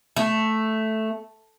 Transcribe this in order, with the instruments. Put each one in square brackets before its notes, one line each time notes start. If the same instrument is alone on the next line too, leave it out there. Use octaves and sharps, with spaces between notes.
[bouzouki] A3